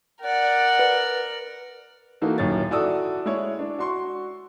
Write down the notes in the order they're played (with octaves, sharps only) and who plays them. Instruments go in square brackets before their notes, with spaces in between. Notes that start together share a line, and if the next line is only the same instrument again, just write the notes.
[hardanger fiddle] A#4 D5 [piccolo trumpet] F#5
[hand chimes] B4
[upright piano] E3 A#3 D#4 F#4 A4
D#1 F#2 D#4 C#5 A6
E4 F#4 A4 D5 D#6 E6
G#3 E4 G#4 C#5
D4
F#4 C6 C#6